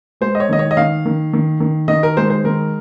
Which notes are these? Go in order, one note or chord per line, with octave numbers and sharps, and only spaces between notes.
G#3 C5
D#5
C#5
D#3 D#5
C#5
D#5
D#3 F5
D#3
D#3
D#3
D#3 D#5
A#4
G#3 C5
C5
D#3 A#4